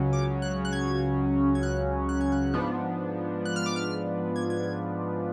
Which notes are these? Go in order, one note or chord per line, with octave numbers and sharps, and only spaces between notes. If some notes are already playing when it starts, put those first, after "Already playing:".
Already playing: C#2 C#3 F#3 C#4
D6
F#6
F#6
G#6
G#6
F#6
F#6
G#6
F#6
G#2 F3 B3 D4
F#6
F6
D6
F6
G#6
G#6